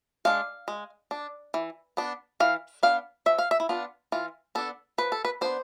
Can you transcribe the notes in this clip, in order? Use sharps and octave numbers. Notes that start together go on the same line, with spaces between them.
G#3 D4 F5
G#3
D4
E3
B3 D4
E3 F5
B3 D4 F5
F3 E5
F5
E5
E4
B3 D4 F4
E3 F4
B3 D4 A4
F3 B4
A4
B4
B3 D4 C5